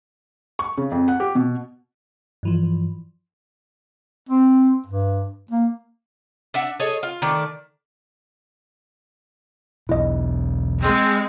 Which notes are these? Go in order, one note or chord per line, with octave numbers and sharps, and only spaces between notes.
C#6
C#3
F2
F#5
G4
B2
G2 E3 F3
C4
G2
A#3
D4 E5 F#5
G#4 A4 C#5 D#5
F4
D#3 A3 D5
B1 E2 B3 E4 D#5
G#3 C4